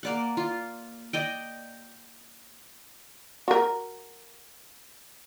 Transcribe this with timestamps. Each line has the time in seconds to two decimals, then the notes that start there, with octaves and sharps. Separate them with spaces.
0.03 A#3 D5 F#5
0.37 F4
1.13 D5 D#5 G5
3.48 F#4 A#4